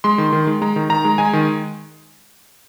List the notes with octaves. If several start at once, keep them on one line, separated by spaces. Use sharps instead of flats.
G#3 C6
D#3
D#3
G#3
G#3 A#5
D#3
D#3 A#5
G#3
G#3 G#5
D#3